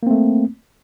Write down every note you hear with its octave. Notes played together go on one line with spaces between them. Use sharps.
A3 A#3 C4